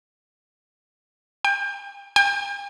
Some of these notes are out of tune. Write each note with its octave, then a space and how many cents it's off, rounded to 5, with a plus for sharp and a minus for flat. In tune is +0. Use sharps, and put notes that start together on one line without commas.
G5 +30
G5 +45